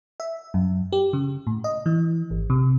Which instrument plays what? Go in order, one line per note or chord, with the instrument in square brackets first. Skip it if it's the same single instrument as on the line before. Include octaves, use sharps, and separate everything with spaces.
[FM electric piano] E5
F#2
G4
C#3
A2
D#5
E3
G#1
C3